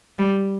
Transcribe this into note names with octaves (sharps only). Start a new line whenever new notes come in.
G3